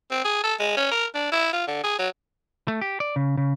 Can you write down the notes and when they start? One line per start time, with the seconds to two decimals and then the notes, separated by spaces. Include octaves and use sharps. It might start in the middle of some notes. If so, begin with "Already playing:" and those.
0.11 C4
0.24 G#4
0.44 A4
0.59 G#3
0.77 C#4
0.91 A#4
1.14 D4
1.32 E4
1.53 F4
1.67 D3
1.83 G#4
1.99 F#3
2.68 A3
2.81 G4
3.00 D5
3.16 C#3
3.37 C#3